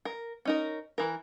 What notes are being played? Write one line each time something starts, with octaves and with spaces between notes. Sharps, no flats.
A#4
C#4 D#4 A#4
E3 A#4